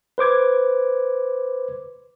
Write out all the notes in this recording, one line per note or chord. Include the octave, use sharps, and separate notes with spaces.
B4 C5 D6 G#6